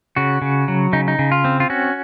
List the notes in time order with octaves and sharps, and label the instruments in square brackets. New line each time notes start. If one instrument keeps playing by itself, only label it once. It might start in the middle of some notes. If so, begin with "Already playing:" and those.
[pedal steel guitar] C#3 F#4
C#3
F#3
C#3 D#4
D#4
C#3
F4
C4
F4
C#4 F#4